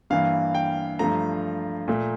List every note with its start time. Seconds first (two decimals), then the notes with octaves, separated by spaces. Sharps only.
0.10 G2 E3 A#3 F5
0.55 G5
0.99 G2 F3 A3 A#5
1.88 A#2 A3